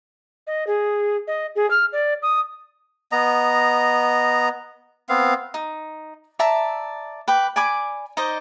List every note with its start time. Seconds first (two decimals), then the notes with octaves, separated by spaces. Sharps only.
0.47 D#5
0.67 G#4
1.27 D#5
1.56 G#4
1.71 F6
1.93 D5
2.22 D#6
3.12 B3 D#5 A#5
5.09 B3 C4 F5
5.54 D#4
6.39 D5 E5 A5 A#5
7.28 B4 G5 D6
7.56 D5 G#5 B5 D6
8.17 D#4 C5 D5 D#5